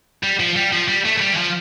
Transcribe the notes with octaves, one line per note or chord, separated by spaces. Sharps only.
G3
F3
G3
F3
G3
A3
A3
G3
E3
F3